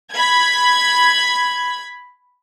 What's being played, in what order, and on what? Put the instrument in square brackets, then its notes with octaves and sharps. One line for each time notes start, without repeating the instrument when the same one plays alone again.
[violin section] B5 G#6